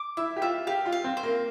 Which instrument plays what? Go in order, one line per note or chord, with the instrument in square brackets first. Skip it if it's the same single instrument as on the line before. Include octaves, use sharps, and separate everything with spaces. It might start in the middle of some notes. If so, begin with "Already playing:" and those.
Already playing: [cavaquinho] D6
[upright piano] E4 [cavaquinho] E5
[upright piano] G4
[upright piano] F4 [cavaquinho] E5
[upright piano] G4 [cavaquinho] F5
[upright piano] F4
[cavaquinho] F5
[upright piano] C4
[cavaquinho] C5
[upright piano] A#3